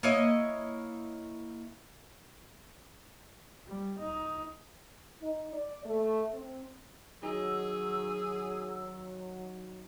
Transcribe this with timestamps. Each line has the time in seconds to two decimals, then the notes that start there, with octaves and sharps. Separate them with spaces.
0.03 A#3 E4 C#5 D#5
3.67 G3
3.99 D#4
5.22 D#4
5.53 D5
5.86 A3
6.32 C4
7.23 D#3 F#3 G#4 E6